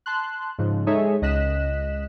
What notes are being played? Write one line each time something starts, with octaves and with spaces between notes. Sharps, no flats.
A5 C6 F#6
G#2 C#3 F3
G#3 D#4 G#4 A4 C#5 E5
C#2 D#5 F#6 B6 E7